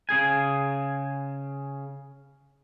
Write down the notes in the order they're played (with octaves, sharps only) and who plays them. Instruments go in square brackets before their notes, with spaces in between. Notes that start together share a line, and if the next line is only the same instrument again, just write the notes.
[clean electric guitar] C#3 G#4 G#5